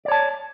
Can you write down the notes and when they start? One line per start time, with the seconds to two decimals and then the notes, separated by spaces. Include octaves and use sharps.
0.05 D5
0.08 C#5
0.12 A5